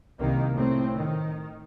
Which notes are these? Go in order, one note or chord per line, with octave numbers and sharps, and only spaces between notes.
C2 D#3 A#3
A2 C4
D#3